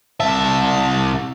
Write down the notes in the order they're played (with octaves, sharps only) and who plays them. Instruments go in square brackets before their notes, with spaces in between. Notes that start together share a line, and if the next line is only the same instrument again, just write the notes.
[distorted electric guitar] C2 E5 [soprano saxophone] A5